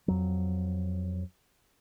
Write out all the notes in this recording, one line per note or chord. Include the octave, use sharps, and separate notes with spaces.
F2 F#3